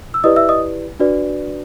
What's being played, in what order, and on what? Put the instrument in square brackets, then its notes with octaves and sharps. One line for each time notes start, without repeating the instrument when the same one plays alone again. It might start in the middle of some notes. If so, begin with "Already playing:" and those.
[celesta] E6
E4 G4 B4 D5 D#5 D#6
E5 E6
D#5 D#6
D4 F#4 B4 D5